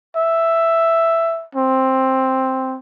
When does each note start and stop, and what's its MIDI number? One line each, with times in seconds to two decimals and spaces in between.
0.16 1.45 76
1.55 2.77 60